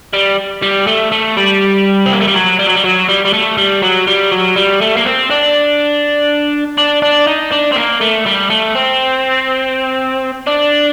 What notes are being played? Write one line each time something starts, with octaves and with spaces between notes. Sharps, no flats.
G3
G3
A3
A3
G3
C4
A#3
A3
G3
F#3
G3
F#3
G3
F#3
G3
G3
A3
G3
F#3
G3
F#3
G3
A3
A#3
C4
D4
D4
D4
D#4
D4
C4
A#3
A3
G3
A3
C4
D4